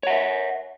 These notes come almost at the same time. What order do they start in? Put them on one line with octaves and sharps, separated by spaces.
C#5 F#5 E5